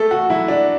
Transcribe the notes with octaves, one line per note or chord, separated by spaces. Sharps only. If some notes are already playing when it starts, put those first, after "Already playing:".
Already playing: A3 A4
F#4
F#3 E4
D4